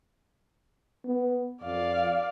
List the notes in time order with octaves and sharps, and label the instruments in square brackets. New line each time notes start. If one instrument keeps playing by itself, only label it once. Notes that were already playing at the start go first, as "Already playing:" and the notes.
[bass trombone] B3
[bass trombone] F2 [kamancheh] D5 F5